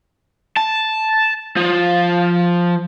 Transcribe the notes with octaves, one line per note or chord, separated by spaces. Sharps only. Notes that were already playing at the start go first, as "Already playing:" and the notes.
A5
F3